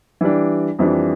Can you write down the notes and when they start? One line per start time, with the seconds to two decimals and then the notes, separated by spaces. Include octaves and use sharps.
0.21 E3 G3 D4
0.79 F2 E3 G3 D4